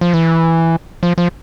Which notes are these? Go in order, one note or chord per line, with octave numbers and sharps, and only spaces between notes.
F3
E3
F3
F3